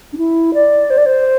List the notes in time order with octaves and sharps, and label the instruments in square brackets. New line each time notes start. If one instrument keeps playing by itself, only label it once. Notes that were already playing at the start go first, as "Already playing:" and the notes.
[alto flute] D4
E4
D5
C5
D5
C5